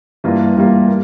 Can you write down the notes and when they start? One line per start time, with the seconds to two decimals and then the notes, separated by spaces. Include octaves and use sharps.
0.24 G2 E3 G3 A#3 F4
0.56 G2 E3 G3 A#3 F4
0.88 A#3